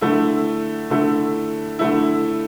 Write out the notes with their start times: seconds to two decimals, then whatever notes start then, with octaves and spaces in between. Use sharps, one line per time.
0.01 D3 A3 E4
0.90 D3 A3 E4
1.79 D3 A3 E4